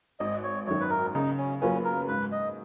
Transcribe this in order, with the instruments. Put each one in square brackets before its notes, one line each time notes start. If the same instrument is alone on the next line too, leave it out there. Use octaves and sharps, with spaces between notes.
[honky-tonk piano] G#1 [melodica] D#5
[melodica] C#5
[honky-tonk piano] F#2 D#3 [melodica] C#5
[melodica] B4
A#4
[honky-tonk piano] C#3 [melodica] D#4
[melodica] C#4
[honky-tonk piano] F#3 A#3 F4 B4 [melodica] C#4
[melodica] A#4
[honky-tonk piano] G#2 [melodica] B4
[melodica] D#5